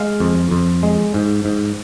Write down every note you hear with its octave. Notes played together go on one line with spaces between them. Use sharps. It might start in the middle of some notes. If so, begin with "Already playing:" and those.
Already playing: G#3 F5
F2
F2
G#3
G#2
G#2